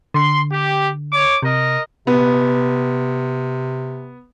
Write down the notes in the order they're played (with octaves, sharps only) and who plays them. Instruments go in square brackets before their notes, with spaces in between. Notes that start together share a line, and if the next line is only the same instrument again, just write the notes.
[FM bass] D3 [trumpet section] C6
[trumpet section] G4
C#5 D6
[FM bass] C3 [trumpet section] A#4 D#5
[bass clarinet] C3 [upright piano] B3